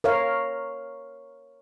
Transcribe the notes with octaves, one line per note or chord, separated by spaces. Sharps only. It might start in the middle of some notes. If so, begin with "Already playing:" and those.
A#4 C#5 F5